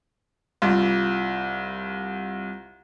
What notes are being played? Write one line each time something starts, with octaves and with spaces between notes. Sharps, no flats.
C2 F4